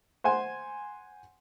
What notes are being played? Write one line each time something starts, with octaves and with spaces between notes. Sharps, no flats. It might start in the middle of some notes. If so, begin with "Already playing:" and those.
C5 F#5 G#5 C6